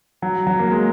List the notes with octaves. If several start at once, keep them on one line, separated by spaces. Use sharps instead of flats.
F#3
F#3
A#3
G#3